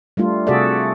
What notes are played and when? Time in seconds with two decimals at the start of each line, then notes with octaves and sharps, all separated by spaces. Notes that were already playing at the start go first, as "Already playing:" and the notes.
0.17 G3 A3 D4 F4
0.47 C3 F#4 G#4 A4 D5 E5